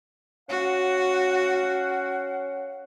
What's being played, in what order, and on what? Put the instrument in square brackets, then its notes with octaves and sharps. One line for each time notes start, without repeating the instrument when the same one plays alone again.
[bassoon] C#4 [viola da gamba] F#4 [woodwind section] F5 F#5